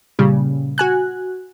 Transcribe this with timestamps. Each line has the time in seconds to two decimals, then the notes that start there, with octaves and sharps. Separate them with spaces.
0.19 A#2 C#3 G3
0.78 F#4 G#5 F#6